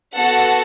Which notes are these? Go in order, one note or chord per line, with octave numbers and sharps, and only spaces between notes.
B3 F#4 A4 F#5 A5